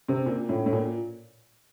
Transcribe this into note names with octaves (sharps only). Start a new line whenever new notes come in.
C3
A#2
A2
A2
A#2